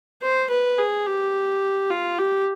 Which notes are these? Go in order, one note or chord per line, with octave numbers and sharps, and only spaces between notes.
C5
B4
G#4
G4
F4
G4